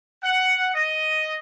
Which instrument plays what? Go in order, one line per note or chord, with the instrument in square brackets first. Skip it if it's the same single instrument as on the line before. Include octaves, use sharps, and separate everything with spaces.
[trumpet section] F#5
D#5